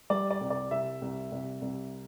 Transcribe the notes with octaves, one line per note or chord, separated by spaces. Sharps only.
G3 D5
D5
C2
D5
C2 E5
C2
C2
C2